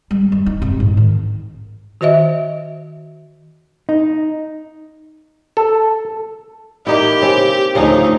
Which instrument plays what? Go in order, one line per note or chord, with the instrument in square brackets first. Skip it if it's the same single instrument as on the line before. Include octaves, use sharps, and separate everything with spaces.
[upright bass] G3
G3
D#4
C3
G#2
D#3
[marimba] D#3 F#4 C5 D#5 E5
[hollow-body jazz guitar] D#4
[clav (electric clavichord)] A4
[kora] A#3 D#4 E4 [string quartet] G4
[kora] C#3 C4
[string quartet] D2 D#4 [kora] C#3 F3 C4